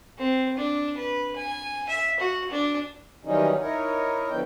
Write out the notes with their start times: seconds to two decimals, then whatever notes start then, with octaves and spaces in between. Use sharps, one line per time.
0.18 C4
0.57 D4
0.97 B4
1.36 G#5
1.89 E5
2.20 F#4
2.51 D4
3.25 D#3 E3 F#3 G3 C#4 D#4
3.60 D#4 E4 A#4 C#5
4.30 D3 F3 B3 G5